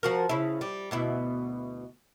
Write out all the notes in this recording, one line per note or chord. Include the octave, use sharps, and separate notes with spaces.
F3 F#4 A#4
C#3 E4
G3
D2 B2 E4